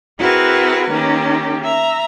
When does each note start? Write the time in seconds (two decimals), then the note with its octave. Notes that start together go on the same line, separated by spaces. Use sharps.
0.19 C4 E4 F#4 G#4 A#4 B4
0.91 D#3 A#3 C#4 G4
1.63 E5 A#5